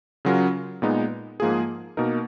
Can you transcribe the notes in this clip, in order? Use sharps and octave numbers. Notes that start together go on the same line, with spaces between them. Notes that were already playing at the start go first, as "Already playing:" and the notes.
C#3 F#3 C#4 F4 A#4
A#2 G#3 B3 D#4
G#2 F3 A#3 F4 G#4
B2 A#3 D#4 A#4